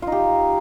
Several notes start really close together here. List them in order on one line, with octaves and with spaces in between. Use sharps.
F4 D#4 G4